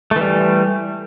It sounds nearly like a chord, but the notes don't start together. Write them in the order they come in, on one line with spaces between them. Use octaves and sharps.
A3 E3 G3